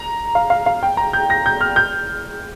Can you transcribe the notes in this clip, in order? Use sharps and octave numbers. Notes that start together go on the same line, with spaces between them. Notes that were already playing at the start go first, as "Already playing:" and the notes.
Already playing: A#5
F5
F5
F5
G5
A#5
G6
A#6
G6
F6
G6